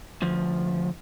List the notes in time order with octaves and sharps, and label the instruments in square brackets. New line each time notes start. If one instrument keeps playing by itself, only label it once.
[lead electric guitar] D2 F3